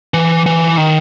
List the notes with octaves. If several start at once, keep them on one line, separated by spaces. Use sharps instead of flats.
E3
E3
D#3